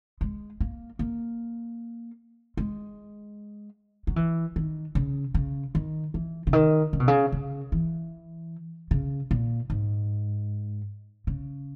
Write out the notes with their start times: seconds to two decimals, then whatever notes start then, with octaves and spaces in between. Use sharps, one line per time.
0.21 G#3
0.61 A#3
0.99 A#3
2.57 G#3
4.07 F#3
4.16 E3
4.56 D#3
4.95 C#3
5.34 C#3
5.75 D#3
6.14 E3
6.47 C#3
6.53 D#3
6.93 C#3
7.00 B2
7.08 C#3
7.32 C#3
7.72 E3
8.91 C#3
9.31 A#2
9.70 G#2
11.27 C#3